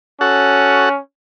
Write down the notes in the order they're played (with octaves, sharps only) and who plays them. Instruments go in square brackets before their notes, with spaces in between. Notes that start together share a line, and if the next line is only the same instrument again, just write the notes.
[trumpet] C#4 [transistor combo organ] F#4 A4 F#5